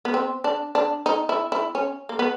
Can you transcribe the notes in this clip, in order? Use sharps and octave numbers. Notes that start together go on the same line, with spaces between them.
B3
C4
D4
D4
D#4
E4
E4
C#4
A#3
B3